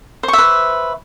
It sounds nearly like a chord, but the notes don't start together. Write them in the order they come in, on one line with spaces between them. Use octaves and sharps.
C5 C#6 E5 B4